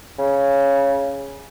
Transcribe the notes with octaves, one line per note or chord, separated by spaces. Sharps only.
C#3